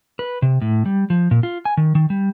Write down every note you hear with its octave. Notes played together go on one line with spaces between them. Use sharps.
B4
C3
A2
G3
F3
A#2
F4
G#5
D#3
D#3
G3